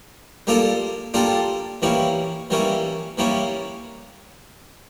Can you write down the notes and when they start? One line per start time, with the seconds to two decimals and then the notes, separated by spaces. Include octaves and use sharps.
0.47 G3 A#3 D4 F4 A4
1.14 G3 A#3 D4 F4 A4
1.82 E3 G3 A#3 C#4 E4
2.50 E3 G3 A#3 C#4 E4
3.18 E3 G3 A#3 C#4 E4